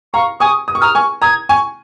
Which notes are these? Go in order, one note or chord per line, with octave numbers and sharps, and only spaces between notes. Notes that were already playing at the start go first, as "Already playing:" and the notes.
F5 A#5 C#6
G#5 C#6 D#6
D#6
C#6
A#5 D#6 F6
G#5 C#6
A#5 D#6 G#6
G#5 C#6